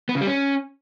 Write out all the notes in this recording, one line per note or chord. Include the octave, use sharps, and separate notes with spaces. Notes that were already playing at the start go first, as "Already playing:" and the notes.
B3
C#3
G3
C#4